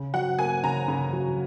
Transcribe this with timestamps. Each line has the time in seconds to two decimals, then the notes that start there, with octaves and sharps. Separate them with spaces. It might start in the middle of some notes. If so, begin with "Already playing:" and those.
Already playing: C#3
0.14 F#3 F#5
0.39 A#3 G#5
0.64 C#3 A#5
0.88 C#3
1.13 F#3